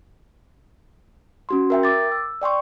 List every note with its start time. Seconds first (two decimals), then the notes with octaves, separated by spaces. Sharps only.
1.49 C#4 F#4 C6
1.70 A#4 E5 G5
1.83 D6 A6
2.12 E6
2.41 D5 G5 C6 C#6